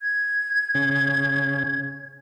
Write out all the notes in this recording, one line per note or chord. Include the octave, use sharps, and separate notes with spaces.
G#6
C#3